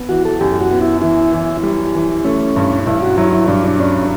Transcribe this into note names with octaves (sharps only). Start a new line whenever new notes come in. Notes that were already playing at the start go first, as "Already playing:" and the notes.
Already playing: B3
E3 F#4
A4
F#2 G4
F#4
B3
E4
E3 E4
E3
G3
E3
A3 C#4
G2
G2 E4
F#4
F#3 E4
E4
G2 D4
D4
C#4 D4